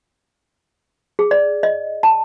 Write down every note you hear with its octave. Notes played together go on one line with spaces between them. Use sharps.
G#4
D5
D#5
A5